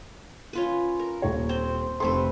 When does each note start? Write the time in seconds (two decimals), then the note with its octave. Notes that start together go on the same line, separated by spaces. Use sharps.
0.53 C#4 F4 B4
0.99 A#4
1.22 D#1 C#5
1.49 C4 C5
2.00 F1 A3 C4 B4 C6